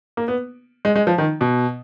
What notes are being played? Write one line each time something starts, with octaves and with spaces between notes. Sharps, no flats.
A#3
B3
G#3
G#3
F3
D#3
B2